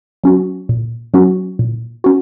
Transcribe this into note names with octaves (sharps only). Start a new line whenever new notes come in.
F#3 C#4 F#4
A#2
F#3 C#4 F#4
A#2
C#4 F#4